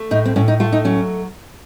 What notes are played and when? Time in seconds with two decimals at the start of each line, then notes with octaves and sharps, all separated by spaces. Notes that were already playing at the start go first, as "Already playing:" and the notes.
Already playing: A3
0.11 A2 D#4
0.25 C4
0.36 A2 C#4
0.48 D#4
0.60 A3 F4
0.72 D#4
0.85 F#3 C#4